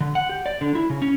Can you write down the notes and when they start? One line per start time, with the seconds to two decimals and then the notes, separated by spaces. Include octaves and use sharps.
0.01 D3
0.15 F#5
0.29 G4
0.46 D5
0.61 D3
0.75 E4
0.90 C#3
1.02 C#4